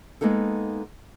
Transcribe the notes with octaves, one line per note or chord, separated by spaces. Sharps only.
G#3 A#3 B3 D#4 A4